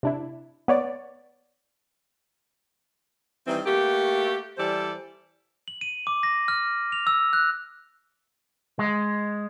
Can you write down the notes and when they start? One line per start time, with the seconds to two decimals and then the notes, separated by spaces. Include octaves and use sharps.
0.03 C3 D4 E4
0.68 B3 C#5 D5
3.46 D#3 E3 G3 C4
3.65 A3 A#3 F#4 G4
4.57 E3 G3 A4 C5 D5
5.68 F#7
5.81 D#7
6.07 D6
6.23 A#6
6.48 F6
6.92 F7
7.07 E6
7.33 F#6
8.79 G#3